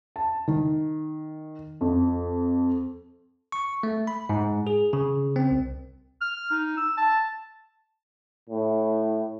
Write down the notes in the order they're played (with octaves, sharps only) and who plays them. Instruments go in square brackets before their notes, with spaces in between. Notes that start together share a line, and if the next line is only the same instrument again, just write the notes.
[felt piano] A5
D#3
F2
[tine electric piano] C#6
A3
B5
G#2
G#4
C#3
C4
C2
[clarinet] F6
D#4
E6
A5
[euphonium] A2